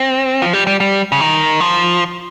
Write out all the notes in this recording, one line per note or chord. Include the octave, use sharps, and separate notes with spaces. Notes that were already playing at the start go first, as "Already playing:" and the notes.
Already playing: C4
F3
G3
G3
G3
C#3
D#3
F3